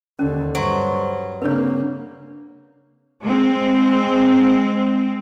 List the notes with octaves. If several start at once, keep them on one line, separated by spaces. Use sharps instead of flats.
D#2 D3 C#4
G2 F#3 C5 C6
C#3 A#3 C4 D4 B4 C#5
G#3 C4